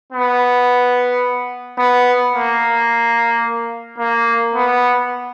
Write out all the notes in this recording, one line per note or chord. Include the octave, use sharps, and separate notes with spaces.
B3
B3
A#3
A#3
B3